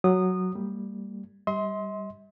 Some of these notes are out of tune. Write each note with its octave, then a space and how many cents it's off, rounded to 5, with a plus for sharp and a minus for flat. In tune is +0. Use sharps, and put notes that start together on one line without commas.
F#3 +0 D#6 -20
G3 +0 A#3 -35
G3 +0 D#5 +45 C6 +0